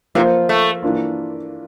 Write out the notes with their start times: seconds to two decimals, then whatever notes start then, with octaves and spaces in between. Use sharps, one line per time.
0.15 C3 F3 A#3 F4
0.49 A3
0.83 E3 A#3 D4 F4